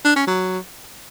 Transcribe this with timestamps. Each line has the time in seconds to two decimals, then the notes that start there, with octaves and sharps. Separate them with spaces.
0.05 D4
0.16 C#4
0.27 F#3